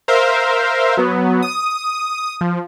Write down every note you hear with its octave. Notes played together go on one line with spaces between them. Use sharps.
A#4 C5 E5 F5
F#3 B3
D#6
F3